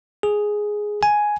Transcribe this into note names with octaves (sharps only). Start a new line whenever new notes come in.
G#4
G#5